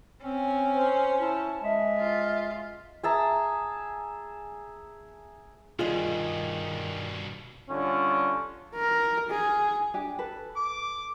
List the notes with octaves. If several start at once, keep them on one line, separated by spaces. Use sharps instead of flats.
C4 C#4
C5
E4 A5
G#3 E5
F4
G#4 E5 A5 A#5
G2 B2 D#3 F4 G#4 D#5
D3 G3 C#4 F4
A#4
G#4
D4 G4 G#5
A4 B4
D6